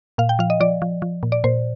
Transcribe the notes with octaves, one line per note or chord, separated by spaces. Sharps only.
A#2 F5
G5
F3 F5
D#5
F3 D5
F3
F3
A#2
D5
A#2 C5